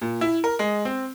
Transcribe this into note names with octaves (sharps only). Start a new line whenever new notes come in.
A#2
E4
A#4
G#3
C4